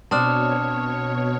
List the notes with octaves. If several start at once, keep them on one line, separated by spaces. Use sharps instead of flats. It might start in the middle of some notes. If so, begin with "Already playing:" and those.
B2 C4 D4 C#5 A5 D#6 F6